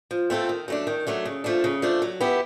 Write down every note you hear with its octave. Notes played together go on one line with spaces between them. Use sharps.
F3
A3 C4 F4 A4
D#3
F#3 A3 D4
D#3
F#3 A3 D4
C#3
F3 A3 D4
C#3
F3 A3 D4
F#3
B3 E4 G4